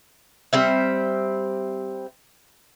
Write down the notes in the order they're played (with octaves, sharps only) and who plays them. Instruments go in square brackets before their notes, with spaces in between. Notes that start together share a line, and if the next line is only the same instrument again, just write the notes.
[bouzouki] G3 C4 E5